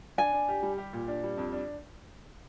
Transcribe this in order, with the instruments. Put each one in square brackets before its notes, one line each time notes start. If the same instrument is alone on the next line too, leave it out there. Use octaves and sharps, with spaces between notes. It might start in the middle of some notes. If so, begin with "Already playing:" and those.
[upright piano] D4 [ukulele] G#5
[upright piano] D4
G4
G3
G4
A#2
D4
G3
F2
D4